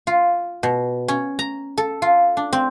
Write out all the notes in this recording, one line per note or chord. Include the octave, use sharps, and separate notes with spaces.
F4
B2
C#4
A#5
A4
F4
D4
C4